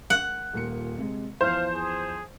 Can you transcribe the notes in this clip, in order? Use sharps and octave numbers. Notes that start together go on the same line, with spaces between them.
F#5
D#1 A#2 C#7
C3 G#3
E2 F3 C5 F5
G#4